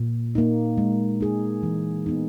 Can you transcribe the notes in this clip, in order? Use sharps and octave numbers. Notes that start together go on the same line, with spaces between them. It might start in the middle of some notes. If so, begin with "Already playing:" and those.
Already playing: A#2
A#3 D#4
G#3
D#4 G#4
E3
B3 D#4